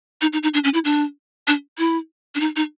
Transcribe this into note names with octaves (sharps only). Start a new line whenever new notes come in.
D#4
D#4
D#4
D4
C#4
E4
D4
D4
E4
D4
D#4
D#4